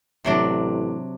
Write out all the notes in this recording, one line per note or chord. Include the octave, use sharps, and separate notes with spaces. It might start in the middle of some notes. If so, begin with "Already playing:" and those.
A1 C3 F#3 D4